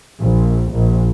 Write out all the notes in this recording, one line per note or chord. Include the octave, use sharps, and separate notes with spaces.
A#1
A#1